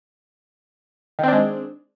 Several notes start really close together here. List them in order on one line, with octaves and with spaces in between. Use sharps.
D#3 C4 D4 G#3